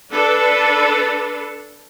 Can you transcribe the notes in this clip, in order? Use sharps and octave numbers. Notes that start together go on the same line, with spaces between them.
D4 A4 B4